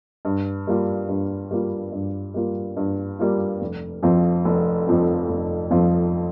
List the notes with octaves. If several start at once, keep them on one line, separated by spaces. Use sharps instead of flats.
G2
G3 A#3 F4
G2
G3 A#3 F4
G2
G3 A#3 F4
G2
G3 A#3 F4
F1
F2 F3 C4 F4
F1
F2 F3 C4 F4
F1
F2 F3 C4 F4